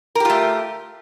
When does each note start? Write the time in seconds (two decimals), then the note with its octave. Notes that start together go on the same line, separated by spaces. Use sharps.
0.15 A#4
0.20 G4
0.25 F4
0.30 A3